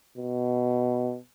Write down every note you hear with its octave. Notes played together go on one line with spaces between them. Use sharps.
B2